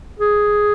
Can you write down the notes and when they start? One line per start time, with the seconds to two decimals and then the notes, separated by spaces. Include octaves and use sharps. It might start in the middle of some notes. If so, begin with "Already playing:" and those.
0.19 G#4